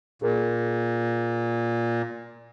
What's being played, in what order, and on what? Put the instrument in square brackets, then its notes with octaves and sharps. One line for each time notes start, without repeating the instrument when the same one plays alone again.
[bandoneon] A#2 [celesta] G#4 A#4